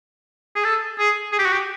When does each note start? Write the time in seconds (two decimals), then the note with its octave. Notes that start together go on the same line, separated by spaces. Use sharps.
0.56 G#4
0.65 A4
0.99 G#4
1.32 G#4
1.39 G4
1.45 F#4
1.53 G4